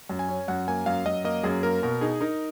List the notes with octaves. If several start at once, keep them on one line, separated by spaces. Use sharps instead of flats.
F#2
G#5
C#4
F#2 F#5
A#3 G#5
F#2 F5
F#2 D#5
A#3 D#5
F#2 G#4
A#3 A#4
B2 A#4
D#4 G#4
D#4 A#4